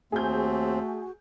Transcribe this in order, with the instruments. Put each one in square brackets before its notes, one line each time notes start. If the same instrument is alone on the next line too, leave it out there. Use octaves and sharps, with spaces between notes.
[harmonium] D#2 C4 [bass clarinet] A3 [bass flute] F#4 [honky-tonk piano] G#4 G6